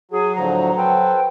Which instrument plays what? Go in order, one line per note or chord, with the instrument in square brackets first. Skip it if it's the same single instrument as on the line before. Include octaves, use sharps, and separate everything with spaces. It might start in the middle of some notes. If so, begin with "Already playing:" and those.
[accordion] F#3 [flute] G#4
[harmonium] A2 D3 F3 [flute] A#5
[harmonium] A4 B4 C5 [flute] G5